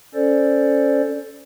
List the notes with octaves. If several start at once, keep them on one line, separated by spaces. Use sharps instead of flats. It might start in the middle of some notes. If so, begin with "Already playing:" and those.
C#4 A4 C5 D5